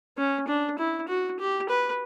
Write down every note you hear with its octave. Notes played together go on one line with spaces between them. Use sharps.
C#4
D4
E4
F#4
G4
B4